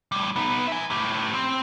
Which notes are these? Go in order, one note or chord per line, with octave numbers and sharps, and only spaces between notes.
A2 G3
B3 D#4
E5 G#5
A2 G4
C4